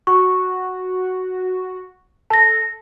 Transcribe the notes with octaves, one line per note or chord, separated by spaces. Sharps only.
F#4 C#6
A4 A5 A#6